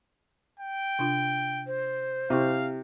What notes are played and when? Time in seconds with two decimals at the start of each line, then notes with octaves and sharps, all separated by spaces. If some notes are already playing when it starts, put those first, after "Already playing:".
0.59 G5
0.99 C3 D4 F4
1.67 C5
2.30 C3 E4 F5 C#6